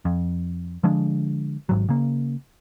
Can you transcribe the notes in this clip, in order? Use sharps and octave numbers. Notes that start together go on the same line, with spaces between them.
F2
D3 F3 G#3 D4
G#1 G#2 F#3
C#3 A#3